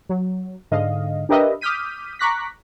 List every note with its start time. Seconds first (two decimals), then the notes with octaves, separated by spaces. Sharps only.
0.09 F#3
0.71 G#2 D3 D#5 F5
1.29 D4 G4 A#4 B4 D#5 E5
1.61 D6 D#6 F6 G6 B6 D#7
2.19 A#5 C#6 D6 F#6 A#6 B6